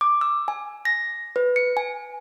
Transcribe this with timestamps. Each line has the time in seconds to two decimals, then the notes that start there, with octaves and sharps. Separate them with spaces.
0.01 D6
0.21 E6
0.48 G#5
0.85 A#6
1.36 B4
1.56 C#7
1.77 G#5